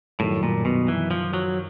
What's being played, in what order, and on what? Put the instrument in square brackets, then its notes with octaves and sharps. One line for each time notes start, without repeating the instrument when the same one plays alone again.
[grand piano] F#2 D#3 G3 [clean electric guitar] A2
[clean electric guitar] A#2
B2
E3
F3
F#3